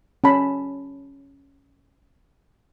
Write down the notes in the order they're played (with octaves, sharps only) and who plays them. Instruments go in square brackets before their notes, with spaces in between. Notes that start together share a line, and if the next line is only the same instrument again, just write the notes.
[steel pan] C#4 A5 B5